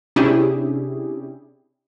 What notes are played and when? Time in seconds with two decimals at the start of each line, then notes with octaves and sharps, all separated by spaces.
0.16 C3 C#4 D4 E4 G4 G#4